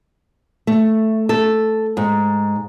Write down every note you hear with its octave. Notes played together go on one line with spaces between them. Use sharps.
A3
A4
G#2